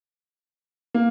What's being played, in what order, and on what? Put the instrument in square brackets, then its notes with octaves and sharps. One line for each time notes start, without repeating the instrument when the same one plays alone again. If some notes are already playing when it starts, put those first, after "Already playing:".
[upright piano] A#3